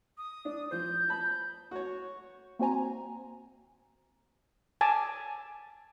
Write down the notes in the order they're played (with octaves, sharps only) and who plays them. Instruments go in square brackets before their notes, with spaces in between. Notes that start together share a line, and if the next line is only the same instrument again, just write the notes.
[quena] D#6
[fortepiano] D4
[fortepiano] F3 C5 [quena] G6
[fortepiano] A5 B5
[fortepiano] F#4 C#5 [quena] C#6
[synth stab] A#3 C4 F#4 C5 G#5 A#5
[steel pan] G#5 A5 D6